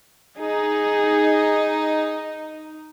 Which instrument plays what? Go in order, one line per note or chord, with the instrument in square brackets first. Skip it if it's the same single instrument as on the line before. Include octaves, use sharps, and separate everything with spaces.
[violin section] D#4 [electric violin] G#4